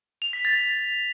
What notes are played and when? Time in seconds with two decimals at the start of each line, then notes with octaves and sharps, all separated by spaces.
0.22 F7
0.33 B6
0.45 A6